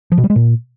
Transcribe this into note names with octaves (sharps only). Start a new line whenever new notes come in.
F3
B2
G3
G#3
A#2